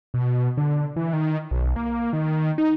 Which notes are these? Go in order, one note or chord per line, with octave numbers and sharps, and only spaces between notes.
B2
D3
E3
D#3
B1
A#3
D#3
D#3
D#4